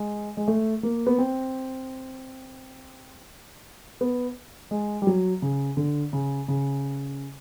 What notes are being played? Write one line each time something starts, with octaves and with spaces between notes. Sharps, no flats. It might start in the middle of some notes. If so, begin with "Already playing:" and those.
Already playing: G#3
G#3
A3
A#3
B3
C4
B3
G#3
G3
F#3
C#3
D3
C#3
C#3